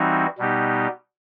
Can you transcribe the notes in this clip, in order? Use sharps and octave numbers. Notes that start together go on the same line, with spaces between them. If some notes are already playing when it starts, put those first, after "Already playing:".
Already playing: E3 G3 C4 D#4 F#4
B2 G3 B3 D#4 G4